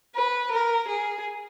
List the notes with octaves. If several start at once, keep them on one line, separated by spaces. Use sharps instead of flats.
B4
A#4
G#4